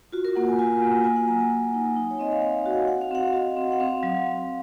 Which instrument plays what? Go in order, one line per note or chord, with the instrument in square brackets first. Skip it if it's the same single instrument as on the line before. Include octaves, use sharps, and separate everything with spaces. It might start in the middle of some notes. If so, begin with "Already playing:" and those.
[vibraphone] F4 F#4
A#4
A#3 F#5
G#5
F4 G#5
A#3
A#3 G#5
F#5
F#3 A#5
G#5
F#3
D#4
D#4
C#5
C4 D#5
F5
C4 F#5
F5
F#4
F#5
F#4 F#5
F5
C4 F#5
F#4 D#5
C4
F#5
C4 F5
F#3